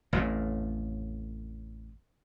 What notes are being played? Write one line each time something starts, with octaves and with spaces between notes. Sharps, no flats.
A1 F2 A2